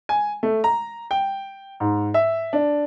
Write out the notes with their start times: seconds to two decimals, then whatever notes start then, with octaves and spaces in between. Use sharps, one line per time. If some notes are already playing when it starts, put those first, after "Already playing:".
0.09 G#5
0.43 A3
0.64 A#5
1.11 G5
1.80 G#2
2.14 E5
2.53 D4